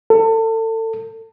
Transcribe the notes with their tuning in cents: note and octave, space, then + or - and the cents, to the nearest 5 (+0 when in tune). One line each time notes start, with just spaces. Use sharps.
A4 +30